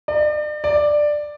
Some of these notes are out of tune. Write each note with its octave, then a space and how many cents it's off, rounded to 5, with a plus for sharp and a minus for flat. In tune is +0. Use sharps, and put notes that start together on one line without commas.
D5 +40
D5 +10